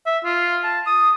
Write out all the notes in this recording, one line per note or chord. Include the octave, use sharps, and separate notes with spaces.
E5
F4
A5
D#6